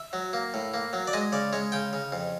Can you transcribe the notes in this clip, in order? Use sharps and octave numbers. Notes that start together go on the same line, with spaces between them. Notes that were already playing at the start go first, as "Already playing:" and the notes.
Already playing: E5
F#3
A#3
A2
A#3
F#3
D5
G#3 D#5
C#3 D5
G#3 C#5
C#3 G5
C#3
F2